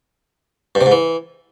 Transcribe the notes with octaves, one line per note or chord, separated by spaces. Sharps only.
G2
C3
G#2
E3